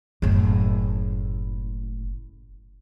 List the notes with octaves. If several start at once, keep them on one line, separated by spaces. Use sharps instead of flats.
F#1 A2